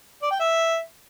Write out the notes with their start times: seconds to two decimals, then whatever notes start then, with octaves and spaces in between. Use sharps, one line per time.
0.22 D5
0.31 G5
0.39 E5